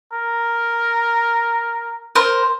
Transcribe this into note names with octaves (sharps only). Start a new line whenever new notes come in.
A#4
A#4 C5